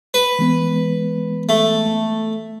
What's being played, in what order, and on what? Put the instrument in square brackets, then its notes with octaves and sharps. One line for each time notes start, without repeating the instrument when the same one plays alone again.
[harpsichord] B4
[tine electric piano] E3 G#3 B3
[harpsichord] A3